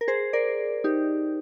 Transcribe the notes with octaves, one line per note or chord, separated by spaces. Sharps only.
A#4
G#4 C5
A#4 D5
D#4 G4